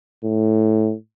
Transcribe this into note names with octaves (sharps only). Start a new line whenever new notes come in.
A2